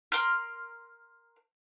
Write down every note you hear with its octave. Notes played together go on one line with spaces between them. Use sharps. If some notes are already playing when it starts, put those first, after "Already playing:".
A#4 C6 F6